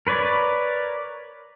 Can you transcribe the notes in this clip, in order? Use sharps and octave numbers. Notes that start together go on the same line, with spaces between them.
A#4 B4 C#5 D5